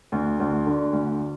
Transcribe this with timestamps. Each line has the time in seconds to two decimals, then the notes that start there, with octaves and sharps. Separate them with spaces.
0.12 D2
0.40 D2
0.67 D3
0.93 D2